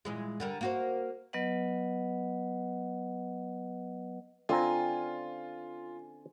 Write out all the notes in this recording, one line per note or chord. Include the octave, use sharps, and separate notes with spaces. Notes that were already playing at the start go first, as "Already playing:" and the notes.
A#2 E3 G#3
D3 G3 A#4
A#3 F#4 C5
F#3 B3 B4 D#5 F#5
D3 C4 F4 G#5 A#5